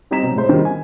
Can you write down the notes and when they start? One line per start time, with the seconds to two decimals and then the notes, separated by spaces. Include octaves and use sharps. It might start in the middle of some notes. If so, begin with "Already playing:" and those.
0.11 G3 C4 D#4 A#5 B6 E7
0.23 B2 F#3
0.36 A2 G#3 C5
0.49 D#3 G3
0.65 G#5